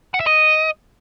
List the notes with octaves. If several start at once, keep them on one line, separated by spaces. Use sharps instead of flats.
F#5
E5
D#5